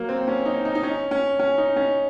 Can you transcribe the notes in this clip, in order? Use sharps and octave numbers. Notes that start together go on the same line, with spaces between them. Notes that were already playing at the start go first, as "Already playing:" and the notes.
Already playing: F#3 A#3
C4
C#4
D#4
D#4
D#4
C#4
C#4
C#4
D#4
C#4